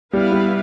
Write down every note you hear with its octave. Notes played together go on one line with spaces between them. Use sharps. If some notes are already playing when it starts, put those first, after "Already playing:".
G3 B3 E4 B4 F5
G3